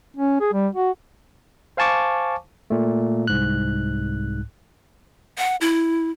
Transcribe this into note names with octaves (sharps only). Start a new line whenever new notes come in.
C#4
G#4
G3
F#4
C5 F5 G#5 A5 C#6 D6
A#2 A3
C2 G#2 F#6
F#5
E4